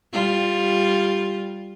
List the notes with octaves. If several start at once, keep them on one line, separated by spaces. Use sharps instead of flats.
G3 F4